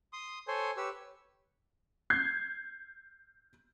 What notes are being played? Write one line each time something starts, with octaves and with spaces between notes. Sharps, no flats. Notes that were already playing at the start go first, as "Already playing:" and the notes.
C6 D#6
A4 C5 C#5 G#5 C6
G4 B4 C#5 E6
G6 G#6 C7